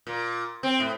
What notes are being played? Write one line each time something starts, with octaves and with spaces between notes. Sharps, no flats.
A#2
C4
A2